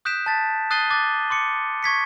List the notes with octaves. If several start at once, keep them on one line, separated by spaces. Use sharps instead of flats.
D#6 F#6 G6 B6 D7 E7
A5 A6 B6
D#6 F#6 A6 C7 D#7 G7
D6 F#6 A6
C6 D6 C#7
C#6 G#6 B6 C#7